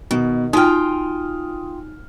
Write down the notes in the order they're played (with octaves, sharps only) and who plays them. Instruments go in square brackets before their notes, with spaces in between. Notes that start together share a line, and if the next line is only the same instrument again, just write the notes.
[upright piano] B2 [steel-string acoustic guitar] D#3
[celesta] D#4 F#4 G#5 [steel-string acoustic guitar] F4 G5 [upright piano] D#6 F6